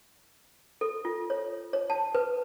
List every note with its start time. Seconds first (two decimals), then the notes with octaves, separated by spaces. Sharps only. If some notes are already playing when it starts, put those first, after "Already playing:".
0.81 A4
1.05 F4
1.30 C#5
1.73 C#5
1.90 A5
2.15 B4